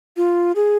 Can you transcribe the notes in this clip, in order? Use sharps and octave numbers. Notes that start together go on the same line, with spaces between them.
F4
G#4